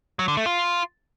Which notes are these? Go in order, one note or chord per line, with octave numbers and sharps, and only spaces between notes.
F#3
D3
A3
F4